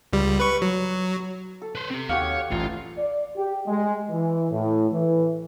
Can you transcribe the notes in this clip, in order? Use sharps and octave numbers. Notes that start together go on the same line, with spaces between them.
C#2 G3
B4 C#6
F#3
A4
B4 C5
C4 G4
D#2 F#4 G4 C#5 F5
A1 F#2 A2 F4
D5
G4
G#3
E3
A2
E3